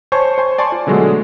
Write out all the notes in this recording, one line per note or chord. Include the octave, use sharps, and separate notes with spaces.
C5 C#5 G#5 A5 C#6
C5 G#5
D5 G#5 A5 C6 C#6
F4
B2 D3 F#3 G#3 A3